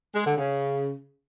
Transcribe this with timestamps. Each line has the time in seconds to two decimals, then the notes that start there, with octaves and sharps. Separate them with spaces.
0.15 G#3
0.26 D3
0.38 C#3